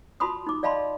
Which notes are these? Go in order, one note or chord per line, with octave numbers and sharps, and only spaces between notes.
F4 F#4 A5 B5 C6 D#6
D#4 D6
D5 D#5 F5 A5 B5 C6